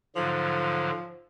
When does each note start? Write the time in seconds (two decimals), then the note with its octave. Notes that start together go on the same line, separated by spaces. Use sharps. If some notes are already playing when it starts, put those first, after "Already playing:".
0.16 G#2 D3 F3 F#3